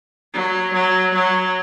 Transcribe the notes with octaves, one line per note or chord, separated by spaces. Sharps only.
F#3
F#3
F#3